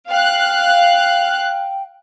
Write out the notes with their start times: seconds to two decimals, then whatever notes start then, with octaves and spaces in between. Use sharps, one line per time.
0.10 F5 G5 F#6